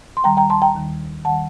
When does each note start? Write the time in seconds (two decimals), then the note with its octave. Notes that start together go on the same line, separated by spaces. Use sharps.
0.17 C6
0.24 D#2 D#3 G3 G5 A#5
0.37 G5 A#5
0.50 A5 C6
0.62 G5 A#5
0.75 D#2 D#3 G3
1.25 D#3 G3 F#5 A5